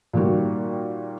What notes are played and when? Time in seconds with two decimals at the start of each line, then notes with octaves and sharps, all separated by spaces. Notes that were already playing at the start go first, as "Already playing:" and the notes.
0.13 A#2 D#3 G3 F#4